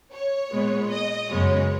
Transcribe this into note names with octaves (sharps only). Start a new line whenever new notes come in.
C#5
A#2 G#3 B3
D#5
F#2 C#3 G#3 B3 C#5